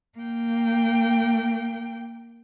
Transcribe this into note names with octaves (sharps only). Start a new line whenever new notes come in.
A#3 G5